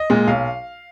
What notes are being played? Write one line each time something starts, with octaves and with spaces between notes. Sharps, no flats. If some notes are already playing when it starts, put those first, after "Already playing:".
Already playing: D#5
A#2 G#3
B1 F5